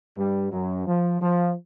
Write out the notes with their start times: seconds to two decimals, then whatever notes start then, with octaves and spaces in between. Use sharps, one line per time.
0.17 G2 G3
0.52 F#2 F#3
0.87 F3
1.21 F3